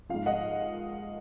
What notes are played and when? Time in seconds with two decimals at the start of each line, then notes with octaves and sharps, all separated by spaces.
0.09 G#2 F3 F5
0.26 D#5 F#5